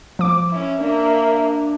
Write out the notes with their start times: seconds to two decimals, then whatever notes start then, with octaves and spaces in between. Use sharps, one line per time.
0.19 F3 D6
0.50 C#4 E4
0.81 A#3 D4 E5